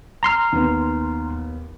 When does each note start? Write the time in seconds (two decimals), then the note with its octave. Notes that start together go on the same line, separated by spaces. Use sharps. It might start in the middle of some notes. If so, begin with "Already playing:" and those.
0.23 A#5 C6 F6
0.52 D#2 B3